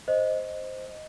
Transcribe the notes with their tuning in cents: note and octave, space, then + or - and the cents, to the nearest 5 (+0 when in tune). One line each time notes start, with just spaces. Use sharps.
C5 +0 D#5 +0